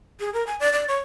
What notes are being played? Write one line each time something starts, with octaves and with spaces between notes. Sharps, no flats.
G#4
A#4
G#5
D5
D5
C#5